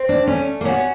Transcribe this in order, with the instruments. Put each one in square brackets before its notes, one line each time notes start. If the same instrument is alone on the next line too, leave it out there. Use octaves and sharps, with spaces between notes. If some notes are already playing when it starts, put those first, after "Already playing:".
Already playing: [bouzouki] C4
[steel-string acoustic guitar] D4
[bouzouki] A3 [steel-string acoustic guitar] C#4
[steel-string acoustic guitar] A#3
[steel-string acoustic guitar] B3 [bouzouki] C#4 F#4